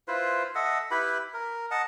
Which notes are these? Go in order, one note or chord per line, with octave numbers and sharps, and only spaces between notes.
E4 F4 B4 C5
A4 D#5 E5 F#5
E4 G4 B4 B5
A#4
D#5 F#5 A5